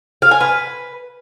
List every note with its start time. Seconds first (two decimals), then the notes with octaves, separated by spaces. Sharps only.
0.22 F5
0.31 G#5
0.41 B4